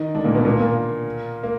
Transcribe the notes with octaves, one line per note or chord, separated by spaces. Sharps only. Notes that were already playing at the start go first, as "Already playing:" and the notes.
Already playing: D#3 D#4
D3 D4
A#2 A#3
B2 B3
A#2 A#3
A#2 A#3
A#3